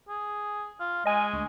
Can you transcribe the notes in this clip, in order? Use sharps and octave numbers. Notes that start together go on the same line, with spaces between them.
G#4
F4
G#3 D#5 G#5
D2